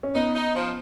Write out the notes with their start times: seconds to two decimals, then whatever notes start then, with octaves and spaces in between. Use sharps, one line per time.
0.03 C#4
0.15 B3 D#4
0.35 D#4
0.55 F3